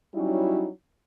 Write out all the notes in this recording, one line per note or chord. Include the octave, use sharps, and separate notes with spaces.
F#3 G3 C#4 D#4 E4 F#4